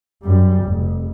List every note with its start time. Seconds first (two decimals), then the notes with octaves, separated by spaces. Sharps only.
0.22 F#2 G3
0.64 F1